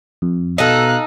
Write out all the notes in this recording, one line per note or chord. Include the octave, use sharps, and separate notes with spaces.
F2
B2 D#4 A4 D#5 F5 F#6